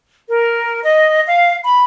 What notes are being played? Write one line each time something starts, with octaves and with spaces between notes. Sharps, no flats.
A#4
D#5
F5
B5